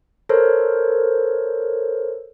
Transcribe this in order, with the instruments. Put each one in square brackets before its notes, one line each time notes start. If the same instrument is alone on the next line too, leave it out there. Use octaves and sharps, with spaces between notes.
[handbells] A4 A#4 C5 C#5